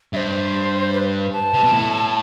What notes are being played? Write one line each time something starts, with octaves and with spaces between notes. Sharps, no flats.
G2 C5 E5
B4
A5
C3
B2
A2